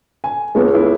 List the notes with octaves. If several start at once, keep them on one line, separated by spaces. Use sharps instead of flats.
G#5
C#2 G#3 A3 B3
E4